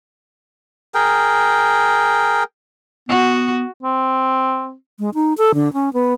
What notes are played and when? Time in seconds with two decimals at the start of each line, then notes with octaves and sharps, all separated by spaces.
0.94 G#4 A#4 G5
3.09 B3 F#4
3.83 C4
4.99 G#3
5.14 D#4
5.38 A4
5.54 D3
5.73 C#4
5.93 B3